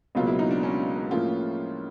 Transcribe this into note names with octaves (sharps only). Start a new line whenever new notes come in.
C#2 B2 F#3 A#3 F4
E4
D#4
D4
C#4
A2 F3 A#3 C#4 E4 F4